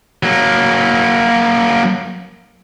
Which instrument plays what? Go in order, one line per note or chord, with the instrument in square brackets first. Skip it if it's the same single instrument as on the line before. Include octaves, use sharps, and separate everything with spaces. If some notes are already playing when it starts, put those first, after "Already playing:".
[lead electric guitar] F#3 A#3